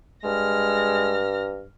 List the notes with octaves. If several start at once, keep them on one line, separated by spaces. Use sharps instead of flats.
G2 G#3 F6 A#6